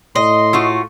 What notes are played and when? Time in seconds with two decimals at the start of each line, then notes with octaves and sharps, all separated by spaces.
0.15 A2 D#5 C6
0.53 A3 F4 F#4